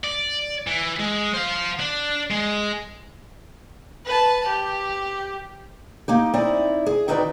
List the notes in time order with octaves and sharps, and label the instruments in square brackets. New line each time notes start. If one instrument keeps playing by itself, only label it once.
[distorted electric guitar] D5
E3
G#3
C5 F5
D4
G#3
[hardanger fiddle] B4 A5
G4
[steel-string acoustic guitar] A#3 D#4 G4
C4 D#4 E4 D5
G#4
D#3 C4 D#4 F#4 B4 D5